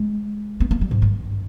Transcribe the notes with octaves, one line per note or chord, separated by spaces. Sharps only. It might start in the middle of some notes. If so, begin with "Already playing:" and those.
Already playing: G#3
B3
A#3
G3
G#2
G2